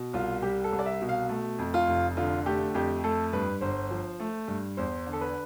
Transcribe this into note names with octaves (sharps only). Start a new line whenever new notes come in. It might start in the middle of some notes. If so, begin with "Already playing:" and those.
Already playing: B2
C2 F4
G3 G4
A4
C2
D5
E5
B2
F5
A3
F2
F4
F1
D3 F4
A3 G4
F2 G4
A3 A4
G2 B4
G1 C5
F3
A3
G2
E2 C5
D3
A4
B4